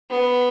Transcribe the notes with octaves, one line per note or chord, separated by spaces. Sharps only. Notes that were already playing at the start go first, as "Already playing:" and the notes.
B3